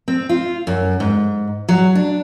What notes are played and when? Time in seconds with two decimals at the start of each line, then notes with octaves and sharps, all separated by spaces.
0.08 C4
0.29 F4
0.67 F#2
1.00 G#2
1.69 F#3
1.95 D4